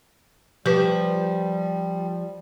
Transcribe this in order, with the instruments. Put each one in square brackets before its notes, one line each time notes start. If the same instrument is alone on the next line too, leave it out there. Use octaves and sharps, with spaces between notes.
[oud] F3 [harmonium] G3 [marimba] G4 B4